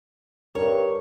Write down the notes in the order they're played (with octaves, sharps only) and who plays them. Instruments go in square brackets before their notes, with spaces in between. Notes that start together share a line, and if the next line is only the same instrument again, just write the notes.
[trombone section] G2 [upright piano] A#4 [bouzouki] C#5